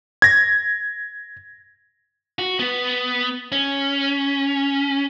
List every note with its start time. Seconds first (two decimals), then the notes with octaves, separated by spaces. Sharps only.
0.22 G#6 A#6
2.39 F#4
2.59 B3
3.52 C#4